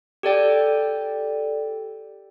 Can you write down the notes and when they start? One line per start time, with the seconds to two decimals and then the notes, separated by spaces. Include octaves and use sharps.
0.23 G4 A4 D5 G5